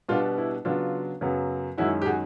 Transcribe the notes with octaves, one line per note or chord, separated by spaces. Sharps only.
B2 G3 B3 D4 F4
E4
C#3 F#3 B3 D4 F4
F#2 C#3 F#3 B3
F#2 D#3 G#3 C#4 E4 F#4
G4
F#4 G#4